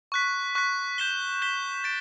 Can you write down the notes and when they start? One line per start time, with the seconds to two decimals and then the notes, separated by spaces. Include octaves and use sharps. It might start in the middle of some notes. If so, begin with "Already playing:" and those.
0.12 C#6 F#6 B6
0.55 C#6 F#6 B6
0.98 G6 B6 E7 G7
1.42 G6 B6 E7 G7
1.84 A6 D7